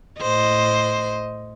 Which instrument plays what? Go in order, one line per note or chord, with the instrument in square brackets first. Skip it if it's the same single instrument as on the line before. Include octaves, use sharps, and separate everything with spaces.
[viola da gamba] A2 C5 D#5